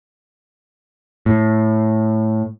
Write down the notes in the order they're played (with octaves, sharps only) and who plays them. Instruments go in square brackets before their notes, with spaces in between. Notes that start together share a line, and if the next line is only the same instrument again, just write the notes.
[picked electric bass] A2